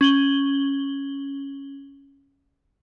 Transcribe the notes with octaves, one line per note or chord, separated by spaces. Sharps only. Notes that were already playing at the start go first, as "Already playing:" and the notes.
C#4 F#7 G7